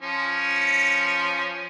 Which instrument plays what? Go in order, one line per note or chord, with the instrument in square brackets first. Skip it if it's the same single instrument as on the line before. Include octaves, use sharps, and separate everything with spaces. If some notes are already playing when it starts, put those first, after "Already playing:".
[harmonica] F3 C#4